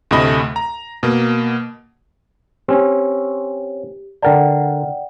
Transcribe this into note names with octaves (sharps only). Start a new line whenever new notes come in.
D2 A2 C3 A3 D#5 B5
A#5
B2 A#3
C4 C#4 G4
D3 A#4 D5 F#5 G5 A5